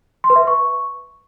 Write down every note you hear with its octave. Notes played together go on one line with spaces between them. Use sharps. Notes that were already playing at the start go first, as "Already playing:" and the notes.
C6
B4
E5
B4
C#6